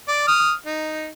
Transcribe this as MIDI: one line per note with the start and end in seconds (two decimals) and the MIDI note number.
0.08 0.25 74
0.28 0.52 87
0.28 0.52 89
0.66 1.09 63